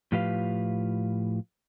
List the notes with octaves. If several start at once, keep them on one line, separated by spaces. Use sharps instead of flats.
A2 F3 F4 G4 B4 F5